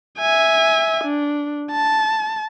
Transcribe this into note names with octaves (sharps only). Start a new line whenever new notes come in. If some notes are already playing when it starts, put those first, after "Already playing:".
E5 G#5
D4
A5